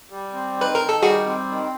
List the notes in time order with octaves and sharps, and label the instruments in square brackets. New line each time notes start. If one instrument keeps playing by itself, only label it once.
[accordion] G3
C4
[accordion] D#3 [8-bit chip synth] B4
[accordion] D#3 [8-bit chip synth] A#4
[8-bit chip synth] A4
[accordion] G3 [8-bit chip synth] F#4 G#4
[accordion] C4
D#3